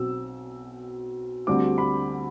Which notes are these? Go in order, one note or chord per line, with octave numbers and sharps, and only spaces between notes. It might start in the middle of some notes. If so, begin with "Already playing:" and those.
Already playing: B1 B2 F#3 C4 E6
D2 D3 G3 C4 D6
B5